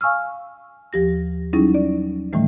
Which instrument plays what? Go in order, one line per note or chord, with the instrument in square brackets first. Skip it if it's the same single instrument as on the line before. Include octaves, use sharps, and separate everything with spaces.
[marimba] F5 G#5 C#6 E6 F6
D#2 F3 G4 A#6
F#3 G3 C#4 D#4 E4 G#4
D5
A2 D#3 E3 G3 A3